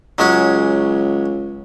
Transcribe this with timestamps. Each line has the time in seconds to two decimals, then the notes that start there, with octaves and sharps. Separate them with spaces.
0.18 C#2 F#3 G#3 C#4